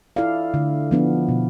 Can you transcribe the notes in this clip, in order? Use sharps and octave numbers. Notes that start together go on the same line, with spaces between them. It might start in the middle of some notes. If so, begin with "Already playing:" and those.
E4 A4 D5 F5
D3
F3 B3 D4
B2